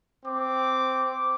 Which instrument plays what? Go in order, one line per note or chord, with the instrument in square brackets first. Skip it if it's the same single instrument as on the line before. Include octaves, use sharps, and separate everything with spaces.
[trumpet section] C4 D6